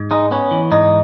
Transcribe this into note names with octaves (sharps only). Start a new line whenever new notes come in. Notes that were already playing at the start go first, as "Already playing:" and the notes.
Already playing: G#2
G#3 D#4
B3 C#4
E3
G#2 D#4